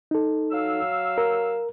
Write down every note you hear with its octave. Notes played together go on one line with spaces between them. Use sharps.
D#4 A4
F#3 F5 E6
A#4